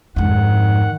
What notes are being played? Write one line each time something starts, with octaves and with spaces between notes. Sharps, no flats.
F2 G#2 D#3 F#5